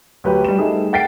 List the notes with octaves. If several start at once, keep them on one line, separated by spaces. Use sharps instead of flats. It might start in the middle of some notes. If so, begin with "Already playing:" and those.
D2 F#3 G4 B4
G3 E7
G3 A3 D#4 G#4
F#5 G5 A6 B6 C7 D7